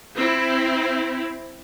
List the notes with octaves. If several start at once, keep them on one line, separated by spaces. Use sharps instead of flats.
C4 E4